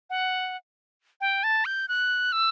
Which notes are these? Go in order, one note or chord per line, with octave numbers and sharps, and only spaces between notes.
F#5
G5
A5
G6
F#6
E6